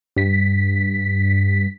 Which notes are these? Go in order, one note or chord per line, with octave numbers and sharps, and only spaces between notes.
G2 B6